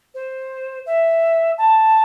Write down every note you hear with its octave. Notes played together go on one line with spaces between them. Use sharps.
C5
E5
A5